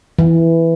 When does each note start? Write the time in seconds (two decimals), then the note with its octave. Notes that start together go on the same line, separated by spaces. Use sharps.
0.19 E3